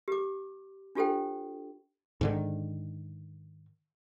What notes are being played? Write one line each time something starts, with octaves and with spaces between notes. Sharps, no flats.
G4 D6
D4 F4 G4 A4 C5 G5
G#2 D3 D#3